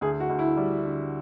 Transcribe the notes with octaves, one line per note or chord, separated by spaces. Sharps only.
D2 G#4
F#4
D2
E4
G3
D3